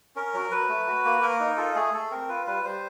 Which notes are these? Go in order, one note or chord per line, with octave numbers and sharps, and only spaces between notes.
C#4 A#4
F#3
F#3 B4
A3
F#4
A#3
A#3 A#4
D#4
F4 A4
A3 G#4
A3 A4
C4 A#4
F4 B4
G3 B4
G3 C5